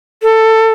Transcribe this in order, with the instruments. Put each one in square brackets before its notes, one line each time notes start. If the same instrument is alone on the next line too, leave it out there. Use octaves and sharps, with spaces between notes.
[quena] A4